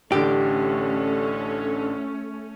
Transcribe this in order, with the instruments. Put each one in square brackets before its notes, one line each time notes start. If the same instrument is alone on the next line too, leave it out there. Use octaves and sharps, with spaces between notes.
[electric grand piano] A1 D3 [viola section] A3 C#4 [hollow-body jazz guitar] G4